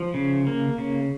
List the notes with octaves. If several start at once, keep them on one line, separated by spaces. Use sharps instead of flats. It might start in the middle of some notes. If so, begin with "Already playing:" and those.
Already playing: F3
C#3
A#3
C#3